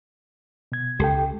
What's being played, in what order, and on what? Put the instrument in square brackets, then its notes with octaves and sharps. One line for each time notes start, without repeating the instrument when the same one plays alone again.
[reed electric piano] B2 G#6
[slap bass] C#2 [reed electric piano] G4 A4 G5